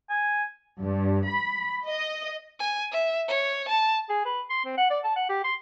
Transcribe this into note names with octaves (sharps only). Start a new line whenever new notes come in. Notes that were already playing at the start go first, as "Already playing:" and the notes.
G#5
G2
B5
D#5
G#5
E5
C#5
A5
G#4
B4
C6
C4
F#5
D5
A5
F#5
G4
C6